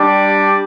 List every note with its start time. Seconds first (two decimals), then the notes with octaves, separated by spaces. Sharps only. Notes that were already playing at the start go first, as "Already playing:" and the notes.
Already playing: G3 D4 G4 D5